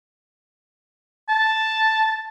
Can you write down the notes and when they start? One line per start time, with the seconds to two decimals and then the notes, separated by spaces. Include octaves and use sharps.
1.29 A5